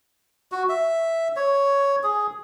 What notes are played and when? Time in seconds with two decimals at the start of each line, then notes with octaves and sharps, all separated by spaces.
0.52 F#4
0.69 E5
1.36 C#5
2.03 G#4